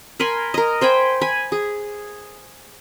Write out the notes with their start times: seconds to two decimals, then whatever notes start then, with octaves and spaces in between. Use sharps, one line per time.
0.20 A#4 G#5 B5 C6
0.54 A#4 D#5
0.81 C5 G5 G#5 B5
1.21 G#5 B5
1.52 G#4